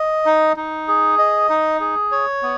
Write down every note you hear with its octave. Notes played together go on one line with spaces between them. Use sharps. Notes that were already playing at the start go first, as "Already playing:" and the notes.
Already playing: D#5
D#4
D#4
G#4
D#5
D#4
G#4
C#5
B3